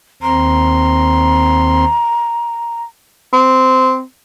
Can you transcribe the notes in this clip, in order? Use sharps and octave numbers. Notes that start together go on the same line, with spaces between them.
D#2 C4 A#5 C6
C4